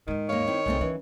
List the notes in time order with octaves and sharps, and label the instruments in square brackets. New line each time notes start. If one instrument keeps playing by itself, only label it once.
[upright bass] D#2 G#2 [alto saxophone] D#3
[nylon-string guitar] A#3 F5 [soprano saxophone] C#5
[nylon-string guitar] C4 E4
[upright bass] C2 [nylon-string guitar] C#3 A3 C4
[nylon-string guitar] E3 [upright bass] C#4